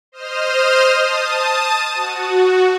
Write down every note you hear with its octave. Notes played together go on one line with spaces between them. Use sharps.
C5 D#5 D#6 F6
A5 D#6
F#4